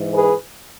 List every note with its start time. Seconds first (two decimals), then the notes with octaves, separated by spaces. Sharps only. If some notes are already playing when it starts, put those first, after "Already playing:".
Already playing: G#2 E3
0.13 G#4 B4